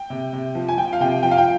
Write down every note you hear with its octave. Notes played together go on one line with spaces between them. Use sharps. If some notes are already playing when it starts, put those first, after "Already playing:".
Already playing: G5
C3
C3
F3
G#5
F3 G5
F5
C3 G5
F3 G5
F5
G5